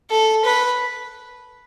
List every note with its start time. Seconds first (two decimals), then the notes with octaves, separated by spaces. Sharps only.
0.10 A4
0.45 B4